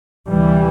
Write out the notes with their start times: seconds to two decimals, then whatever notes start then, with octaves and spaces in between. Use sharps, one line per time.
0.29 D2 C3 E3 G3